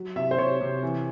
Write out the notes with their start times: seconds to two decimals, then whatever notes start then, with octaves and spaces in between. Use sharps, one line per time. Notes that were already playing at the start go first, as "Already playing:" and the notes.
Already playing: F#3
0.16 C3 E5
0.31 C5
0.38 C3 C#5
0.61 C3
0.83 E3